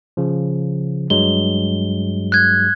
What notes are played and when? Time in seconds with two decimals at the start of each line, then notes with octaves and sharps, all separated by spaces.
0.17 C#3 F3
1.10 G2 F#3 G#3 G7
2.32 F#6 G#6